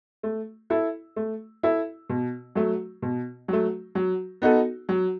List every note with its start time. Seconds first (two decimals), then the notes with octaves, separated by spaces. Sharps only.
0.23 A3
0.70 E4 A4 E5
1.16 A3
1.63 E4 A4 E5
2.09 B2
2.55 F#3 A3
3.02 B2
3.48 F#3 A3
3.95 F#3
4.42 B3 D#4 F#4 A4
4.89 F#3